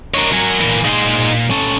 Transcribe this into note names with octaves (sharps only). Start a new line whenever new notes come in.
D4 A#4 C#5 D#5
F#3 A#4 G#5
A#2 E3
A#2 D#4 G#4 C6
C#4 A4